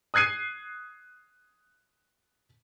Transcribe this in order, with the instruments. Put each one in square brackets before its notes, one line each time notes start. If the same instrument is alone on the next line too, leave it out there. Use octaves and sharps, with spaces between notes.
[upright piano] D#6 F#6 G#6 C7 D#7